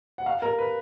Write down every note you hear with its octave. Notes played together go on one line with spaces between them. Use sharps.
F#5
F5
A#4
B4